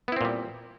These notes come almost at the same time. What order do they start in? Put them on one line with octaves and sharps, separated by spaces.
B3 E4 C4 A#2 G3